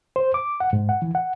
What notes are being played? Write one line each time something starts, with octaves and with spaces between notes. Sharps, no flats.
C5
D6
F#5
G#2
F#5
E3
F#5